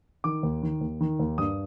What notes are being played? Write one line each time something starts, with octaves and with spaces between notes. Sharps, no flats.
D#3 D6
D#2
D#3
D#2
D#3
D#2
G2 D#6